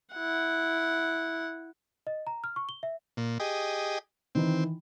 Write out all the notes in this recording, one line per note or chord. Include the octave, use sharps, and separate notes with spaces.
E4 F#5
D#5
A#5
F6
C#6
G7
E5
A#2
G4 G#4 D#5
D#3 E3 C4 D#4